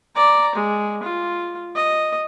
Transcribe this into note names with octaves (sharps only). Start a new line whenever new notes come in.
D5 A#5
G#3
F4
D#5